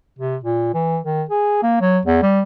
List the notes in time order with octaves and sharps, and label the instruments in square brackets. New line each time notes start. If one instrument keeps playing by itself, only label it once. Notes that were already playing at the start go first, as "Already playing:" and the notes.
[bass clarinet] C3
A#2
E3
D#3
G#4
A#3
F#3
E2
G3